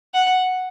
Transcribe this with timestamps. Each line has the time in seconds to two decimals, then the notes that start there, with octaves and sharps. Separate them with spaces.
0.14 F#5